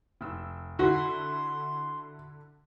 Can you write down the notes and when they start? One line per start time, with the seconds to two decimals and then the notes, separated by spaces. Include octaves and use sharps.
0.21 F1 E6
0.79 D3 E4 F#4 C6